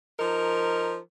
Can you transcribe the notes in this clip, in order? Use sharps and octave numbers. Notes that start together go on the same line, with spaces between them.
F3 D#4 A#4